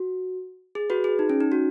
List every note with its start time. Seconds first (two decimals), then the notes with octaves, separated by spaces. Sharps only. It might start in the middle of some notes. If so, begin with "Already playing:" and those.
Already playing: F#4
0.75 G#4
0.90 F#4 B4
1.04 G#4
1.19 D#4
1.30 C#4
1.40 D#4
1.52 F#4